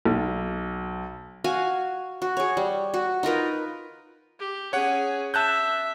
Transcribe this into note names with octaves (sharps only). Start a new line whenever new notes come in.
B1
F#4 F5 G#5
F#4
G#4 C#5
G3
F#4
D#4 F4 A#4 B4
G4
C#4 G#4 C#5 F#5
E5 A5 F#6 G6